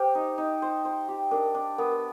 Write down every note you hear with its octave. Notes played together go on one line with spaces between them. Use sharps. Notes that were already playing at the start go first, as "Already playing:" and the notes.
Already playing: G4 C5
D#4
D#4
C5
C5
G4
D4 A#4
D4
B3 A#4